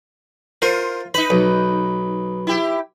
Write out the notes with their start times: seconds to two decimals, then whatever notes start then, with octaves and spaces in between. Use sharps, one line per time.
0.62 F4 A#4 C5
1.14 D#4 B4 B5
1.30 B1
2.47 E4 G4